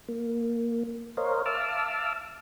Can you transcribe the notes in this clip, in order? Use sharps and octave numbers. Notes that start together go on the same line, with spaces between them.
A#3
A#4 C5 C#5 D#5 F5
E5 F5 A5 D6 E6 F6